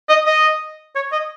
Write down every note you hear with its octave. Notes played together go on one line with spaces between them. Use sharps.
D#5
D#5
C#5
D#5